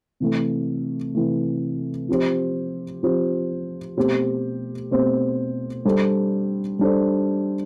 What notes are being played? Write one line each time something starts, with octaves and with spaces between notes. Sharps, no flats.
C3 E3 A3
C3 E3 A3
F3 C4 G4 C5
F3 C4 G4 C5
B2 A3 C4 G4 C5
B2 A3 C4 G4 C5
G3 D4 A4 C5
G3 D4 A4 C5